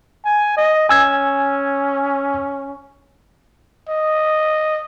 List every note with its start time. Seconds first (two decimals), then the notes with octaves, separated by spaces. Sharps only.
0.25 G#5
0.57 D#5
0.89 C#4 G#5 E6 G#6
3.89 D#5